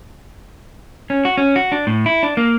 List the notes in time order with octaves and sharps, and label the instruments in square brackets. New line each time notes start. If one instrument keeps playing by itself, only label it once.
[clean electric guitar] C#4
F#4
C#4
F#4
D4
A2
E4
D4
A#3